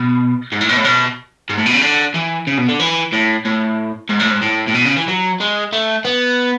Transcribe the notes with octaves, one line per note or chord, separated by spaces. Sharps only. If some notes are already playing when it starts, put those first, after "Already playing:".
Already playing: B2
G#2
A2
B2
A2
B2
G#2
A2
B2
C#3
D3
E3
C#3
B2
D3
E3
A2
A2
G#2
A2
G#2
A2
A2
B2
C#3
E3
F#3
G#3
A3
B3